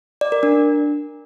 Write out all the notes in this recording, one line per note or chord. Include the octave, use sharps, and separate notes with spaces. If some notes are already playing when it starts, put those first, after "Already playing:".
D5
A#4
D4